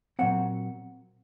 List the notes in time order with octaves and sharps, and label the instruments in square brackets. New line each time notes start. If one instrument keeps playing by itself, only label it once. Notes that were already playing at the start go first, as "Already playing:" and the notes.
[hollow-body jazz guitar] A#2 F#3 C4 F#5